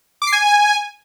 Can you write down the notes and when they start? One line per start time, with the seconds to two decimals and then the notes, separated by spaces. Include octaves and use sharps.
0.22 D6
0.27 C7
0.32 G#5